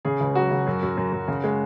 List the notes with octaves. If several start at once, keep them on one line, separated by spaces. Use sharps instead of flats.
C#3 G#4
C#2
F#3 F#4
C#3
F#2
F#2
F#2
F#2
C#3
G#3